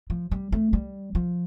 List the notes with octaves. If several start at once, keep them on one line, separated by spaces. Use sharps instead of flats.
F3
G3
A3
G3
F3